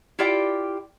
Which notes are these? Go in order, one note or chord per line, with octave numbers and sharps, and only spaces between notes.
E4 F4 G4 D5 G5